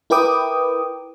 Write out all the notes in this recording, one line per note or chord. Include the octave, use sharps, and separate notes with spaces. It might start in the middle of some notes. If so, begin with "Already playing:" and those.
E4 A#4 B4 G5 D6 D#6